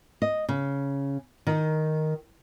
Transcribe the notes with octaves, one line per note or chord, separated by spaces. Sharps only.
D#5
C#3
D#3